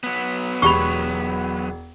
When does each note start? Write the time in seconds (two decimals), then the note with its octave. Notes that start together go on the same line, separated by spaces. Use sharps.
0.03 F#3 B3
0.62 E1 G4 B5 C#6 F7